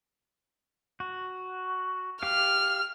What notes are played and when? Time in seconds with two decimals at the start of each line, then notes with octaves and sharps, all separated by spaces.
1.00 F#4
2.23 G4 F5 F6